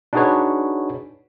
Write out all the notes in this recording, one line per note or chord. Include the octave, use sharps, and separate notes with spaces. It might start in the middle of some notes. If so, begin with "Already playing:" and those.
D4 D#4 F#4 G#4 B4 C#5